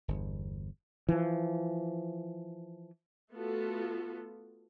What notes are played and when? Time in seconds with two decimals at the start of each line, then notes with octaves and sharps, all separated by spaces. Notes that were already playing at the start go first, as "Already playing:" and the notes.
0.08 G1 E2
1.09 E3 F3
3.32 A3 B3 F4 F#4 A4